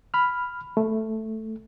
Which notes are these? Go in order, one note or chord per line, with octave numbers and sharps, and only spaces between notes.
B5 F6
A3